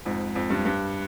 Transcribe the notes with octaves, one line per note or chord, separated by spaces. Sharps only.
F2 G#2
F2
G2
G2